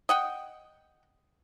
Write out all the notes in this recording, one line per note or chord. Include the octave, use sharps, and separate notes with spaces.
D#5 F#5 G5